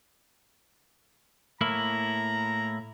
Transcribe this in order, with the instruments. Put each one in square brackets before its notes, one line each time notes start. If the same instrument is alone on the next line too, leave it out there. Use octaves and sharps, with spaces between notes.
[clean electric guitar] A2 A#3 E4 [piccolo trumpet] A#5